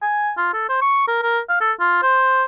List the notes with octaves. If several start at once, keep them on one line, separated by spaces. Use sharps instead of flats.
G#5
F4
A4
C5
C#6
A#4
A#4
F5
A4
F4
C5